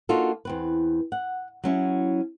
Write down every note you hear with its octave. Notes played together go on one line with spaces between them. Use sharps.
A#3 D4 D#4 F4 F#4 A4
E2 C4 B4
F#5
F#3 C#4 E4